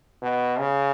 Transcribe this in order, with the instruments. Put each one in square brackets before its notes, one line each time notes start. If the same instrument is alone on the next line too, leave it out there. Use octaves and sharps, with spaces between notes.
[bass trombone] B2
C#3